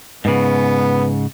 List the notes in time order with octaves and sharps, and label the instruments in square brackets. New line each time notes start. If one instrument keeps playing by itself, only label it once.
[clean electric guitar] G#2 C#3 [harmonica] B3